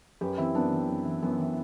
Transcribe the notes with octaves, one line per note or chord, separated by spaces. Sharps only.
F#2 G4 B4
E3 C4 E4
F#2 B3 D4
E3
F#2
E3
F#2 B3
E3